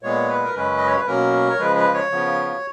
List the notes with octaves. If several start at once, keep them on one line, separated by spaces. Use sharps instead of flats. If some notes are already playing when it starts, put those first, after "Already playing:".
A#2 G#3 B3 C#5
B4
A#4
F#2 C#3 G#3 C#4 B4
D#5
C#5
B4
B2 F#3 A#3 C#4 A#4
C#5
C#3 F3 G#3 B4
B4
C#5
C#3 F3 B3